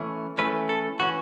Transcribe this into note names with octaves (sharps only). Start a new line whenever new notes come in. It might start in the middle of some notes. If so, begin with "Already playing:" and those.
Already playing: E3 A3 C#4
E3 A3 C#4 B4
A4
E3 C#4 F#4